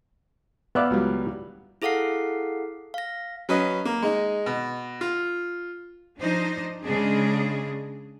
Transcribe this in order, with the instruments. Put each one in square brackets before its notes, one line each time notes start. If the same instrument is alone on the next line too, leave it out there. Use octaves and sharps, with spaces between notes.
[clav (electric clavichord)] B3 D5 F5 [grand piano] E5 E6 F#6
[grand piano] C#2 F#3 G3
[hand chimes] E4 G#4 A4 F5 F#5 C7
F5 A#6
[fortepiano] F#3 C#4 B4 D#5
A#3
G#3 D#4
B2
F4
[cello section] F3 D4 D#4 C5 D#5
C#3 G#3 D4 G#4